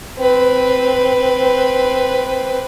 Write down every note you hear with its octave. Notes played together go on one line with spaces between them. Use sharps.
C4 B4